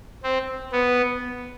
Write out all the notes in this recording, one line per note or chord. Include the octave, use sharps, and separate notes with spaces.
C4
B3